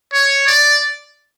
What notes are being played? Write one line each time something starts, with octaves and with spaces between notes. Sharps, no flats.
C#5
D5